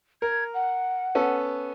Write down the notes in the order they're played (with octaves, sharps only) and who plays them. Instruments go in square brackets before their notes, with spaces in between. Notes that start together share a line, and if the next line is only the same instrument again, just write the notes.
[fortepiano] A#4 [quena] G#6
[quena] F#5
[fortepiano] B3 C#4 A4